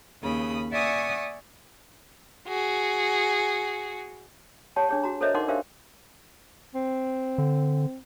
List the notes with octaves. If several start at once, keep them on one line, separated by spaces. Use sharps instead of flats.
D#2 C#3 B5 D#6
D5 E5 F#5 G#5 C#6 D#6
F#4 G#4
G4 C#5 F#5 A5
D4 G#4 C#5
F#4 A#5
A4 A#4 C5 C#5 D#5 E5
D#4 A#4 F#5 C6 D6
D4 G4 A#4 C5 E5 F5
C4
D3